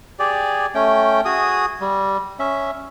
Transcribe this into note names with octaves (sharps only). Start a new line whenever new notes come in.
G4 G#4 D5
A3 C#4 G5
F#4 G#4 D#6
G3
C#4 E5